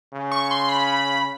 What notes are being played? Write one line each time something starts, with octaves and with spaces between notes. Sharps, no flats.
C#3
C#6
C6
B5